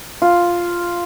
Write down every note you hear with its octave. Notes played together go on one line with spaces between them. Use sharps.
F4